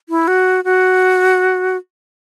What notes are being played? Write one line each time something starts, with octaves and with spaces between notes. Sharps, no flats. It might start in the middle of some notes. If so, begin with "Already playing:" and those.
E4
F#4
F#4